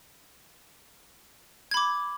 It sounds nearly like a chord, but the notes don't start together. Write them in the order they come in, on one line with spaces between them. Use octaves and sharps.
G#6 B5 D6